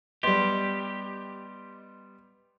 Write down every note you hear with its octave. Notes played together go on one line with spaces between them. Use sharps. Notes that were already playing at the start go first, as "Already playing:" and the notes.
G3 B3 G4 D#5 C6